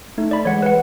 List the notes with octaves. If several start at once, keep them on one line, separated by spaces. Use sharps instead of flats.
A3 D#4
D5 B5
E3 G#3 C#5 F#5
B4 F#5